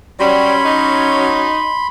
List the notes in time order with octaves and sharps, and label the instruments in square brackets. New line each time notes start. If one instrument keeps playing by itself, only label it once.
[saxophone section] F#3 C#4 [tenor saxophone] G3 [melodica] B5 C6
[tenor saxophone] D#4